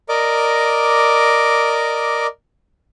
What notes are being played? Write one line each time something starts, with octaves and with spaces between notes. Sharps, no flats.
A#4 D5 D#5 D6